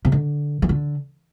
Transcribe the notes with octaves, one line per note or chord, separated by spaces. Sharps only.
C3
D3
E3
D3